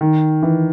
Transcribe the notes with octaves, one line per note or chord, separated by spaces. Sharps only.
D#3
E3